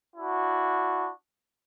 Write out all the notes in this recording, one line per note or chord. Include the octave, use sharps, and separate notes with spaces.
D4 E4 F#4